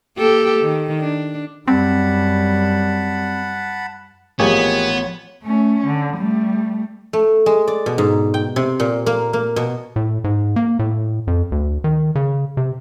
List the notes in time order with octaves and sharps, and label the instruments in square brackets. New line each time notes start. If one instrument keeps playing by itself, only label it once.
[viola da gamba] A#3 G4 A4
D#3
D4
[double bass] F#2 G3 [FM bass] C4 [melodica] F#5 A5 B5
[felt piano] A1 F3 [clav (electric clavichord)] A#3 G4 G#4 [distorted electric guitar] B3 [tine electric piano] C#5 G#6
[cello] A3 C#4
D3
G3 A3
[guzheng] A3
G#3
D5
B2
G#2
G5
C3
A#2
A#3
A#3
B2
[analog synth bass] A2
G#2
A#3
A2
F2
D2
D#3
C#3
C3